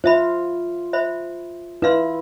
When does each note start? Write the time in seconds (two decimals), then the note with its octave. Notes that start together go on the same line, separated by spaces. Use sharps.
0.04 F4 C5 E5 B5
0.93 C5 E5 B5
1.82 E4 B4 F5 C6